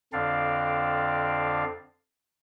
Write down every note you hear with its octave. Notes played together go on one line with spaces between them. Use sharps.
F2 D3 C4 D4 D5 F5